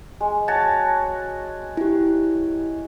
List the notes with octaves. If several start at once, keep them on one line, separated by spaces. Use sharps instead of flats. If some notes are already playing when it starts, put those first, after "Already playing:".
G#3
F#4 C#5 A5
E4 G4